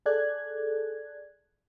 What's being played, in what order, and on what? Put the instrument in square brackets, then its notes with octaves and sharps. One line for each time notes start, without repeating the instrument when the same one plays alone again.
[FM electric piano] G#4 A4 D5 F#6 G#6